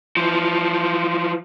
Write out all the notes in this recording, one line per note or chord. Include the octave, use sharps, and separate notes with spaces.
E3 F3